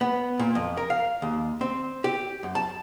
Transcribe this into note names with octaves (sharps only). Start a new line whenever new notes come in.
B3
A#2
F2
A#4
F5
D#2
C4
G4
F#2
A5